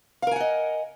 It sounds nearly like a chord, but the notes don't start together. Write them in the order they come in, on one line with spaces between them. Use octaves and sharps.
F5 A#4 G#5 F#5 D#5